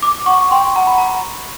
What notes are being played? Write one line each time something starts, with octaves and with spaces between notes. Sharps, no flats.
D6
F#5 C#6
G5 C6
F#5 A#5
B5
A#5